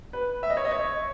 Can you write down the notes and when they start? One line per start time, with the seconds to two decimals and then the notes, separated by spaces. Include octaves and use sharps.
0.13 B4
0.43 E5
0.50 D#5
0.57 C#5
0.65 D#5
0.72 C#5